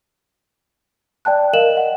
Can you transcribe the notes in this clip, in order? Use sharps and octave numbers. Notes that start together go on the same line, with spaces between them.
D5 G5 A5 F#6
A#4 D#5 F5 E7 F#7
F#5